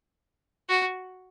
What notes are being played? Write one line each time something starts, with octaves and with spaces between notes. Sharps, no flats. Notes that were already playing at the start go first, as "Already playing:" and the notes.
F#4